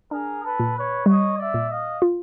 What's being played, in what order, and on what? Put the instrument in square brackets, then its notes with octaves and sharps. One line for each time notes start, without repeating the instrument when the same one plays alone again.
[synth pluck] D4 [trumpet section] G#4 A#4
[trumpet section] A4 B4
[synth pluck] A#2
[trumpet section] B4 C#5
[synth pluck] G3 [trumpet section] C#5 D#5
[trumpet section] D5 E5
[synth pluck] A#2
[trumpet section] D#5 F5
[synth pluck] F4